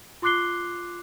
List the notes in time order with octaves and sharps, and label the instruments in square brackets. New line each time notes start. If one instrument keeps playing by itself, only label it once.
[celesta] F4 C6 D6 F#6 C7 G7